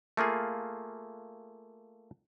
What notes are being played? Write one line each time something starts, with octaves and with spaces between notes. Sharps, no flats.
A3 A#3 F4 G#4